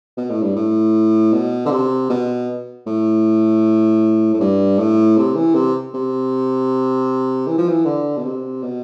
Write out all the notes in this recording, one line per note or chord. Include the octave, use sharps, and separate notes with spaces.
B2
A2
G2
A2
B2
D3
C3
B2
A2
A2
G2
A2
C3
E3
C3
C3
E3
F3
E3
D3
B2
C3
B2